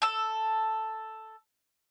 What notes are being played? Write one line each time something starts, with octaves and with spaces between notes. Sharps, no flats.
A4 E6